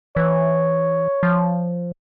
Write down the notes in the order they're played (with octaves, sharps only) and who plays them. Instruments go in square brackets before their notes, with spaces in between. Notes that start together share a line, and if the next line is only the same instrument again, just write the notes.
[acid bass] E3 [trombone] C#5
[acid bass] F3